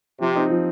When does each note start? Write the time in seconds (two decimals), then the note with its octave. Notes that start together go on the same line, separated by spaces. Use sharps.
0.20 C3 F3
0.35 C4 D#4
0.50 F3